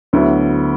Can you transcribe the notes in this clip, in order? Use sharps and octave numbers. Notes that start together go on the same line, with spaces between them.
D2 D3 F#3 B3 E4